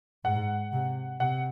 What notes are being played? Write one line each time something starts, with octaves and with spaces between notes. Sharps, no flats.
G#2 F#5
C3
C3 F#5